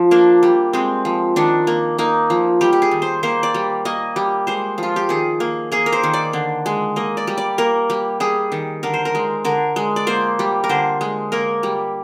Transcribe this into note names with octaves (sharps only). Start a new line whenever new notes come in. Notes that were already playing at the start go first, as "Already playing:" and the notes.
Already playing: F3
A#3 D4
G3
G#3 C4
F3
D#3 D4
A#3
A#3 D#4
F3
G3 G4
G4
G#4
D#3
C5
A#3 C5
D5
G3
A#3 D#5
G3
G#3 C5
F3
F4
G4
D#3 G#4
A#3
A#3 G#4
A#4
C5
D#3
D5
D3
G#3
A#3 D#5
D5
G3
D5
A#3 A#4
G3
G3 G#4
D#3
D3 A#4
C5
A#4
G#3
D3 A#4
G#3
D5
A#3 C5
G3
A#4
D3 C5
G#3
A#3 A#4
G3